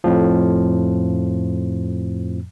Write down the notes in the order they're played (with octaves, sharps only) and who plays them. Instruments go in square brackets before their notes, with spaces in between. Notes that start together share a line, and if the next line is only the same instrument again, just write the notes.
[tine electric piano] F2 A2 F3